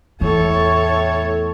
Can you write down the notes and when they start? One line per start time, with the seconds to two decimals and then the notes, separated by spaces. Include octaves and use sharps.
0.21 E2 A2 A4 C#5